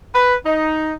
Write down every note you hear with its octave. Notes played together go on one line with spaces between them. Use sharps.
B4
D#4